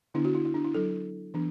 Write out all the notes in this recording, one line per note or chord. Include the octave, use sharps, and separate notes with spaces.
D3 B3 D4 E4
F#4
E4
E4
D4
E4
F#3 D4 A4
E3 B3 D4